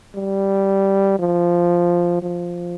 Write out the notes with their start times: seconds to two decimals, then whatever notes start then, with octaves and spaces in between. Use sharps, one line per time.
0.15 G3
1.19 F3
2.22 F3